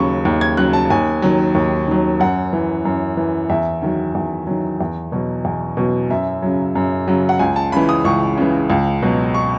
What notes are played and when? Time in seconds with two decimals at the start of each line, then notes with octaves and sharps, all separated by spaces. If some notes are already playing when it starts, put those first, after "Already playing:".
Already playing: D#2 C#3 F#3 B5 C#6
0.25 D#2
0.41 G#6
0.57 C#3 F#3 F#6
0.73 A5
0.90 D#2 G#5
1.22 D#3 F#3
1.55 D#2
1.88 D#3 F#3
2.20 F#2 F#5
2.53 E3
2.85 F#2
3.17 E3
3.49 E2 E5
3.82 D#3 F#3
4.15 E2
4.47 D#3 F#3
4.81 E2
5.12 B2 F#3
5.45 E2
5.77 B2 F#3
6.10 F#2 E5
6.42 C#3 F#3
6.75 F#2
7.08 C#3 F#3
7.29 F#5
7.39 C#2 G#5
7.56 A5
7.72 C#3 E3 B5
7.89 D#6
8.04 C#2 C#6
8.38 C#3 E3
8.70 C#2
9.03 B2 F#3
9.34 C#6